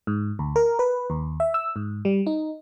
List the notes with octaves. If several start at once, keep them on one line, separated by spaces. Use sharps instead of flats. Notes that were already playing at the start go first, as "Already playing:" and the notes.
G#2
D2
A#4
B4
D#2
E5
E6
G#2
G3
D#4